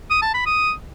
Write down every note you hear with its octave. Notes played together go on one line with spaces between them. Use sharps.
D#6
A5
B5
D#6